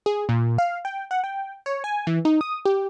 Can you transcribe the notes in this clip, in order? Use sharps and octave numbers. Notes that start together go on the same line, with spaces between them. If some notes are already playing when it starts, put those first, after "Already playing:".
G#4
A#2
F5
G5
F#5
G5
C#5
G#5
E3
D#4
D#6
G4